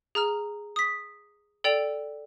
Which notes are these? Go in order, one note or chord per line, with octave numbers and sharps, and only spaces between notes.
G#4 A#5 F6
D#6 B6
A4 D5 G5 F7